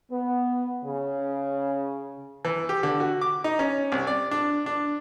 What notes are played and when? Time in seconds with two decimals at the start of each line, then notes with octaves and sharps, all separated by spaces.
0.11 B3
0.84 C#3
2.45 E3
2.69 G4
2.83 D3
3.00 F#4
3.21 D6
3.44 D#4
3.59 C#4
3.92 C2
4.07 D5
4.31 D4
4.66 D4